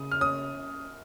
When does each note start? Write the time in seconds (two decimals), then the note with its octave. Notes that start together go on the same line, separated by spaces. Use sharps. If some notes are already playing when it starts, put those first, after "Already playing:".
Already playing: C#3 D#6
0.12 F6
0.21 C#4 D#6